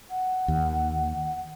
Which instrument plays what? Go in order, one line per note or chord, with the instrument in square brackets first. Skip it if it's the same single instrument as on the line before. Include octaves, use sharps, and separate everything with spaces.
[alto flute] F#5
[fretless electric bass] D#2